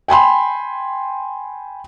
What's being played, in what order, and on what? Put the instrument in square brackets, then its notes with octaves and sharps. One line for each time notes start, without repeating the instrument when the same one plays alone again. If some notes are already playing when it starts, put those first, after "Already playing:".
[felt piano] G5 G#5 B5 C6